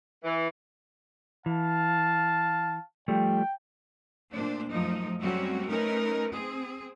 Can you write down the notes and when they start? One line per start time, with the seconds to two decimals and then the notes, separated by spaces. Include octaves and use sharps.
0.24 E3
1.46 E3 F5 A5
3.08 F3 G3 A3 G5
4.34 A#2 A3 D4 C5
4.71 F#2 F3 A3 D#4
5.21 F#3 G3 A3 C4 C#4 F#4
5.67 A3 C#4 D#4 A#4 B4
6.33 C4 G#4